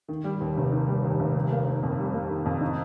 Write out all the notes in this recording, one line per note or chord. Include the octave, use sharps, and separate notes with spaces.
D#3
G3
D#2
F1
D#3
G3
D#2
F1
G3
A#3
D#3
F2
G3
A#3
D#3
F2
D#4